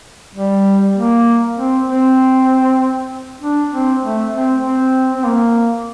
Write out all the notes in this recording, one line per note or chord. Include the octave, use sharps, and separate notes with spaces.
G3
A#3
C4
C4
D4
C4
A3
C4
C4
C4
A#3